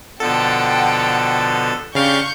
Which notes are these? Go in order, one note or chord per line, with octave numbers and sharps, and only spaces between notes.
B2 D3 F3 A4 F#5 G5 A5
C#3 D4 G4 F5 C#6 G6